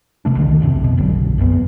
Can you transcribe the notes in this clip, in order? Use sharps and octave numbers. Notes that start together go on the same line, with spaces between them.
E1 C3 A3 D4
C2 D3 D#3
D1 B1 F2 C3
B2
F#1 B1 D3 F#3
F#1 F#2 C3 B3